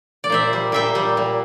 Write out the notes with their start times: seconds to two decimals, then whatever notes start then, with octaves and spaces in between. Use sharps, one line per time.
0.24 D5
0.30 A#2 C5 E5
0.53 G3
0.72 A#2 E5 G5
0.95 G3
1.17 A#2